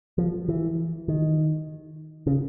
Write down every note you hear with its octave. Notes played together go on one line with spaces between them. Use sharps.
F3
E3
D#3
C#3